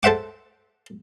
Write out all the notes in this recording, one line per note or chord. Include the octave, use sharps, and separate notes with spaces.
A4 C5 E5 F#5 D6